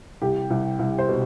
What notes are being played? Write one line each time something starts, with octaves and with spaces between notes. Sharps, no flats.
C2 G4
C2
C2
C5
B2